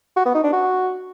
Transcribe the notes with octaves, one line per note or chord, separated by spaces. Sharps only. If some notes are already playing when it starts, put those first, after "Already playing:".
F#4
B3
D#4
D4
F#4